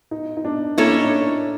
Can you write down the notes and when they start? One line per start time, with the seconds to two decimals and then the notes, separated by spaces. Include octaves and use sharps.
0.11 D#4
0.37 D#4
0.45 D4
0.78 A#3 C#4 D4 E4 A4 C#5
0.92 D#4
1.04 D4